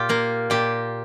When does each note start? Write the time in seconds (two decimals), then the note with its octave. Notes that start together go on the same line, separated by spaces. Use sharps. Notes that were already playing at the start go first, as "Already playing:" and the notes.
Already playing: A#2 F4 G4
0.09 A#3 A#4
0.50 A#2 G4